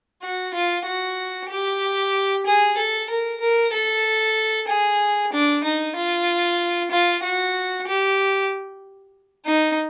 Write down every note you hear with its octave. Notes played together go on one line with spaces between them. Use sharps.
F#4
F4
F#4
G4
G#4
A4
A#4
A#4
A4
G#4
D4
D#4
F4
F4
F#4
G4
D#4